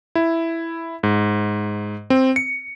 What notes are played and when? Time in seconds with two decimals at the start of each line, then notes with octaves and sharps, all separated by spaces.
0.15 E4
1.03 G#2
2.10 C4
2.36 C#7